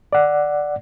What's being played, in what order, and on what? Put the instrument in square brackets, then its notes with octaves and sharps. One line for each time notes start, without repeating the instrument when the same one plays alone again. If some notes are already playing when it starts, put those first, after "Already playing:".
[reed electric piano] D5 F#5